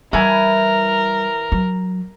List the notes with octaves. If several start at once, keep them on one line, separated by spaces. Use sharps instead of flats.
E3 G3 E4 A#4 G#5
F#3